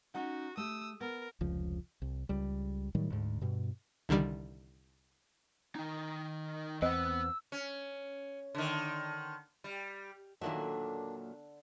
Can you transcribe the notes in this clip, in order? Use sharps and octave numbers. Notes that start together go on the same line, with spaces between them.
C#4 D#4 F#4 F#5
A3 G4 D#6 E6
B3 A#4
F1 C#2 F3
C2
C#2 G3
A2 D#3 F#3 G3
D2 G#2
G2 B2
C2 D3 D#3 G3
D#3 D#4
E2 C4 B4 D#5 F#5 E6
C#4
D3 D#3
G3
A#2 D3 D#3 F#3 A#3 D4 E5